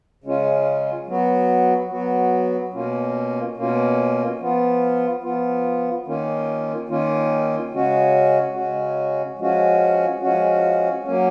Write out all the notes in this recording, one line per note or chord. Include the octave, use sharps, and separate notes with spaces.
C#3 G#3 C#4 F4
F#3 B3 F#4
F#3 B3 F#4
B2 A#3 C#4 F4
B2 A#3 C#4 F4
F3 B3 F4
F3 B3 F4
D#3 A#3 C#4 F4
D#3 A#3 C#4 F4
C#3 G#3 C#4 F#4
C#3 G#3 C#4 F#4
F3 G#3 C#4 F#4
F3 G#3 C#4 F#4
F#3 A#3 C#4